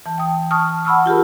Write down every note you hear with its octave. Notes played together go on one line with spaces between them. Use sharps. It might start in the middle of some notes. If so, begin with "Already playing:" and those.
E3 A5
G5 D#6
A5 C#6 D#6 F6
F#5 A5 B5 C#6 E6 F6
F4 G4 G#4 A#4